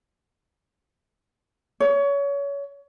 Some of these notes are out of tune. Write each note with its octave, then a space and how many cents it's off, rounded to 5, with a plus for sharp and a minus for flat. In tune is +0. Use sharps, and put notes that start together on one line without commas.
C#5 +25